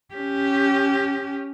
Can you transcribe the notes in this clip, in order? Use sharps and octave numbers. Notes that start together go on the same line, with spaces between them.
C#4 G4